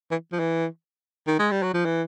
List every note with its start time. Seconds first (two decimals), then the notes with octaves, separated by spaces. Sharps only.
0.11 E3
0.32 F3
0.39 E3
1.27 D#3
1.39 G#3
1.51 G3
1.63 F#3
1.74 F3
1.85 E3